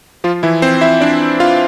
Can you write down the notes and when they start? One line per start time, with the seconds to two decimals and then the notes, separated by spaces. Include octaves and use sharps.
0.24 F3 F4
0.43 E3 E4
0.62 C4 C5
0.81 E4 E5
1.01 D4 D5
1.40 F4 F5